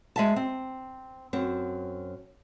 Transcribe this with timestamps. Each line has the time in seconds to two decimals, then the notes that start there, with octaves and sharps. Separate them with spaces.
0.16 G#3 E5 A5
0.36 C4
1.33 F#2 C4